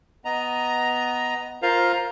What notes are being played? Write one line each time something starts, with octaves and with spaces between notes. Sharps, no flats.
B3 D#5 A#5
F4 A#4 C5 F5 A#5